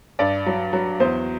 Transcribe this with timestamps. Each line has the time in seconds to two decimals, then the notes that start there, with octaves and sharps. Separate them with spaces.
0.19 G2 D5
0.46 F#3
0.73 F#3
1.00 E2 C5